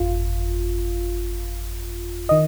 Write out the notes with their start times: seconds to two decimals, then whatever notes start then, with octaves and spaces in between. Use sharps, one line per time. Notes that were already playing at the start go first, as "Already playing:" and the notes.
Already playing: G1 F2 F4
2.29 D#3 D#5